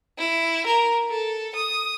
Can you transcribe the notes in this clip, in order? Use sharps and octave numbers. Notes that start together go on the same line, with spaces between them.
E4
A#4
A4
D#6